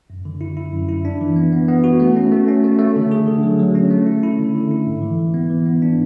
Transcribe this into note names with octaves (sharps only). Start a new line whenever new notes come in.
F#2
D3
E4
E4
F#2
E4
D4
E3
B3
B3
B3
F#4
A3
C#4
A3
C#4
A3
A3
D3
G#4
D3
F#3
F#3
C#4
A3
E4
E4
D3
D3
E4
G#2
E3
E3
B3
E3
B3
D4